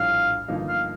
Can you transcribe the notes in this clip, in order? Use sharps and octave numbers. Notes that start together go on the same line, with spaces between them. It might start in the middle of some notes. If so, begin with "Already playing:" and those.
Already playing: A#1 A2 G3 D4 F4 F5
G1 G2 F3 A#3 D#4
F5